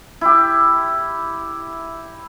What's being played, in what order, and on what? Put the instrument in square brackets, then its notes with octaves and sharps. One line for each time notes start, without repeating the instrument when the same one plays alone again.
[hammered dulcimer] E4 G4